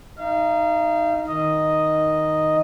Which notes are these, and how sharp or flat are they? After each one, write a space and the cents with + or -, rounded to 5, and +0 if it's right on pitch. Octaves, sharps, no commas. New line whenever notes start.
D#4 +0 F5 -35
D#3 +0 D#5 +0